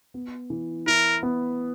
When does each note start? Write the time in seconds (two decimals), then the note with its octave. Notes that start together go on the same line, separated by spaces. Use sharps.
0.14 B3
0.50 E3
0.86 E4 A#4
1.23 B3